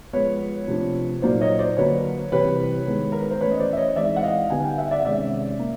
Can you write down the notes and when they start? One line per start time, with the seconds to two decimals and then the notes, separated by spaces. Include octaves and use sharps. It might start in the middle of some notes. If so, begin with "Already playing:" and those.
0.13 F3 G#3 B3 B4 C#5
0.68 C3 F3 A3 D4
1.22 A#2 F#3 A#3 D#4 C5 D5
1.41 C#5 D#5
1.59 C5 D5
1.77 D3 F#3 A#3 B4 C#5
2.32 C3 E3 G3 B4 C#5
2.87 D#3 G#3 B3
3.12 A#4
3.22 B4
3.31 C5
3.41 E3 A3 C#4 B4 C#5
3.52 D#5
3.59 C5 D5
3.73 E5
3.77 C#5 D#5
3.96 E3 G#3 C4 D#4 D5 E5
4.16 F#5
4.23 D#5 F5
4.50 D3 G3 B3 D#4 F#5 G#5
4.63 F5 G5
4.78 E5 F#5
4.91 D5 E5
5.05 C3 D#3 G#3 C#4 D5 E5
5.59 A#3